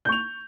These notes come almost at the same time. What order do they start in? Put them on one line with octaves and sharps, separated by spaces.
G6 C#6 F7